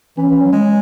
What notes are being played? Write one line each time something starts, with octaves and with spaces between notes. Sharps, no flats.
E3 C#4
E3
F#3
G#3